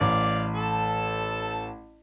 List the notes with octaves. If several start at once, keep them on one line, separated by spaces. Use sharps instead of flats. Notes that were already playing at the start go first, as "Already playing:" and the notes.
A1 D5 F5 D6
A4 A5